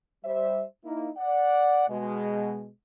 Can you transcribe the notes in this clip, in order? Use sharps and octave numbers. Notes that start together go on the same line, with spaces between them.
G3 C5 E5
A#3 D#4 E4
D5 F#5
B2 G#3